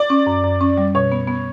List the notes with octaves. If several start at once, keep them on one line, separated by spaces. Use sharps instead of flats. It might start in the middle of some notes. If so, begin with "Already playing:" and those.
Already playing: D5
C#4
F#2
F#2
C#4
G3
B2 C#5
B3
B3